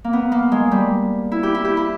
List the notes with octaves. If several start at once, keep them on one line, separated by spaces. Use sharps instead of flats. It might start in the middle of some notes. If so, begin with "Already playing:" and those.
A#3
B3
A#3
G#3
G3
E4
G4
E4
G4
E4